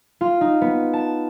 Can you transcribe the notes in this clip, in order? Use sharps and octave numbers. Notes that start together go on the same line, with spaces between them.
F4
D#4
B3
A5